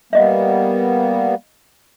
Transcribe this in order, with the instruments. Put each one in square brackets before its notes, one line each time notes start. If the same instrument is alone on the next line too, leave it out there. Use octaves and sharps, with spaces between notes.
[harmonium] G3 A#3 B3 [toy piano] D#5 E5